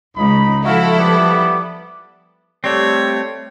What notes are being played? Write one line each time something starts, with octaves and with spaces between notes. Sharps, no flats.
C#2 D#4 D#5 B5
F3 E4 F#4 A4 E5 F5
G3 B3 D6
G3 A3 C4 C#5